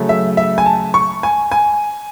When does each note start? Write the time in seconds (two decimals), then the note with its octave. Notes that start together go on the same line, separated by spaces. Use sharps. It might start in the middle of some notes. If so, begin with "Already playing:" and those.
Already playing: C#3 F#3 A3
0.09 E5
0.37 E5
0.58 G#5
0.66 A5
0.94 C#6
1.23 G#5
1.52 G#5